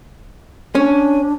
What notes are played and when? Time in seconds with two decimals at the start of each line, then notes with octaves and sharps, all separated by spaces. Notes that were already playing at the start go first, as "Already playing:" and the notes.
0.75 C#4 D4